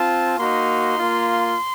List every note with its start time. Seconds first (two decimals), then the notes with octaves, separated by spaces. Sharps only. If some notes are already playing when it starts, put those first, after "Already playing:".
Already playing: C4 F4 A5
0.38 A#3 D#4 F#4 C6
0.98 A#3 F4